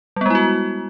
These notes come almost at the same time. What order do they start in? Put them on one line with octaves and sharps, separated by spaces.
G3 B3 G#3 E4 F#4